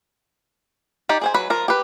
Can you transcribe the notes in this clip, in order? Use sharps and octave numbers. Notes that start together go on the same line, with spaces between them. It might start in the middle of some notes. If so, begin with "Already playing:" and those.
D#4 G4 D5
G#4 C5 G#5
F#3 B4 B5
F3 A#4
G4 B4